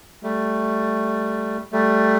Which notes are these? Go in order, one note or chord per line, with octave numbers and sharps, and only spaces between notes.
G3 A3
G3 A3